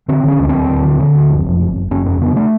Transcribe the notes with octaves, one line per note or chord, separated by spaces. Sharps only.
D3 C4
D3 C#4
D2
D2 C4
D2
D3
D3
D2
F#1
F2
F#1
F#1
F#1 C#4
F2 C#4
C#3 B3
A3